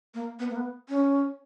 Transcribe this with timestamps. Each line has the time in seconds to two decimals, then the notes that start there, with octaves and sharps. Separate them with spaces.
0.14 A#3
0.39 B3
0.50 A#3
0.56 B3
0.89 C#4